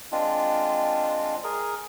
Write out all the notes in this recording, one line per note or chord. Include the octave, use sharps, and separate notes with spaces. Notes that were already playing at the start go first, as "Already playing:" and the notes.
G#3 C4 D4 F4
G#4 A#4